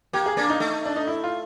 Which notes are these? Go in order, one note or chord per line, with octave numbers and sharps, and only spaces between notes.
A#3 G4
G#4
A#3 D4
D#4
A3
D4
D#4
E4
F4